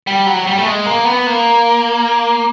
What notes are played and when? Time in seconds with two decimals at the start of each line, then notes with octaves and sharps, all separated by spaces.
0.07 G3
0.26 F#3
0.47 G3
0.58 A3
0.66 G#3
0.86 A#3
1.06 B3
1.27 A#3